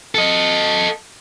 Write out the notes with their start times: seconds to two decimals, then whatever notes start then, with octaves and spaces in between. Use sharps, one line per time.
0.15 A4 D#5